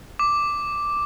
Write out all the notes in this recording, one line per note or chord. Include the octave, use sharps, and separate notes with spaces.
D6